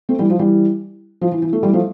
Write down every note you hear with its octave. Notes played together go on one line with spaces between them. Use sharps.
A3 C4
E3 G3
F3
E3 G3
F3
E3
E3
A3
E3 G3
F3 A3